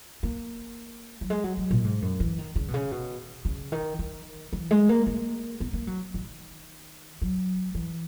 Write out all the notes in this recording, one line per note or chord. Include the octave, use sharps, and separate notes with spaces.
A#3
F#3
G#3
F#3
F#3
A#2
G#2
F#2
E3
D#3
C#3
B2
C#3
B2
C#3
D#3
D#3
E3
G#3
A#3
A#3
B3
A#3
F#3
D#3
F#3
E3